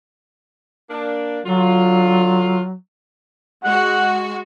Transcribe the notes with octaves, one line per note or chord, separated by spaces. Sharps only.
A#3 D4
D3 F#3 F4
G#3 F#4 F#5